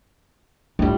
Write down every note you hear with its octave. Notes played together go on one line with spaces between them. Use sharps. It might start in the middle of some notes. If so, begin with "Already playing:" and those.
A2 G3 D4 F4